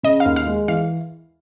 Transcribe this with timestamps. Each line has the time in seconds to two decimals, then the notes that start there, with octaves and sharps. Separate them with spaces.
0.03 C#3 D#5
0.20 F5
0.26 D#2
0.36 F5
0.46 G#3
0.68 E3 F5